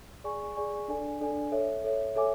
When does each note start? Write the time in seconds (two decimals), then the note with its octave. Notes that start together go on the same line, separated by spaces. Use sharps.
0.24 G#4 D5 G#5 C#6
0.56 G#4 D5 G#5 C#6
0.88 D4 A4 D5 G#5
1.21 D4 A4 D5 G#5
1.52 A4 C#5 E5
1.84 A4 C#5 E5
2.15 A4 C#5 E5 G#5 D6